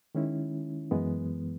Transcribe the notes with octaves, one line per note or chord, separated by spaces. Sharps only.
D#3 G#3 C#4 E4
F#2 E3 G#3 B3